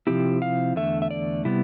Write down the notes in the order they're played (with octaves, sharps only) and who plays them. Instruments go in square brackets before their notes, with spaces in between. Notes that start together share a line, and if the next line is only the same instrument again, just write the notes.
[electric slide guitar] C3 F3 C4 E4 G4
F5
E2 D3 A3 E5
E5
D5
C3 G3 B3 E4